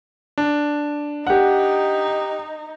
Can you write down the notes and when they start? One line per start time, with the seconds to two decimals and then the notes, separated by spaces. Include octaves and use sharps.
0.38 D4
1.27 D#4 G4 F#5